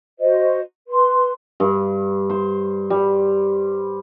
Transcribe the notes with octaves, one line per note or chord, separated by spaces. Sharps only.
F#4 C5 D#5
B4 C6
G2
C5
G3